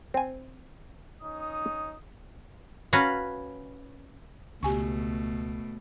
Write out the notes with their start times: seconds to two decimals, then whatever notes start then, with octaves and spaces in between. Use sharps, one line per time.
0.14 C4 G#5
1.22 C#4 D#4 D#6
2.93 C#4 F#4 B4 F5 A#5
4.63 C#2 B2 A3 G4 G#5 C#6